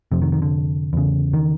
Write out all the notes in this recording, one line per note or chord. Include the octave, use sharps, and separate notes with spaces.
F2 C3 F3
D#3
D#3
D3
E2 C#3
D#3